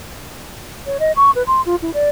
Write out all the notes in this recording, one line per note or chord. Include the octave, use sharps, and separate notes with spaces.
C#5
D#5
C#6
B4
C6
F4
E4
D5